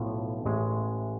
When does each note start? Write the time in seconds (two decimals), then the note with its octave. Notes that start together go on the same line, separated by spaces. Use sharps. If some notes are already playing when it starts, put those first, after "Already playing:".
Already playing: B1 A2 F3
0.45 A1 A2 G#3